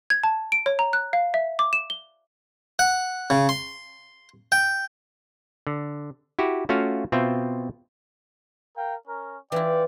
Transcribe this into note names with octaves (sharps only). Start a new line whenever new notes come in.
G#6
A5
D7
C#5
A#5
F#6
F5
E5
D6
E7
G7
F#5
C#3
C6
G5
D3
E4 F#4 G4
A3 C#4 F4 F#4 F5
B2 C4 F4 E5 G5
A#4 F5 G5
C#4 A#4
E3 D4 E4 F4 D5 G5